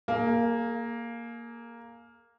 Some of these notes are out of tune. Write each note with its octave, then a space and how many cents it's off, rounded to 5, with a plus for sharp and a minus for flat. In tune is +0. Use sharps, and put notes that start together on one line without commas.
A#3 +0 G#4 +35